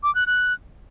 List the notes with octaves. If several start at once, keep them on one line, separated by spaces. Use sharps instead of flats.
D6
F#6
F#6